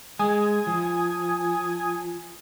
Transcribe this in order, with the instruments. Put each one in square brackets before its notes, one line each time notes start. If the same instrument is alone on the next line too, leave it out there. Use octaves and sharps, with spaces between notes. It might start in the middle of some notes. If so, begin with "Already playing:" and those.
[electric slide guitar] G#3 [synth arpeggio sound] G#5 D#6 G#6
[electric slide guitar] F3